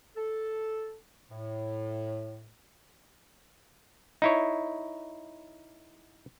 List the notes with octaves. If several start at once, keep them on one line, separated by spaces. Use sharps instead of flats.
A4
A2
D#4 E4 C#5